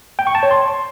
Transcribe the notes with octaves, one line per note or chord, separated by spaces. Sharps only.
G5
C#6
A5
C#5
C6